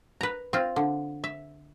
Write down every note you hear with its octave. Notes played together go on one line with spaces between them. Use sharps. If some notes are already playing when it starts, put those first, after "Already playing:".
B4 A#5
C4 F4
D3
E5